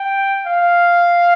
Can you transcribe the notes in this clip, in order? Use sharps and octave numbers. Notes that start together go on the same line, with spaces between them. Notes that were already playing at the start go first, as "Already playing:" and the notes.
Already playing: G5
F5